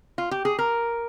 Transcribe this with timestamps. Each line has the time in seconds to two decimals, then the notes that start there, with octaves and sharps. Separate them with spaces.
0.18 F4
0.31 G4
0.45 G#4
0.59 A#4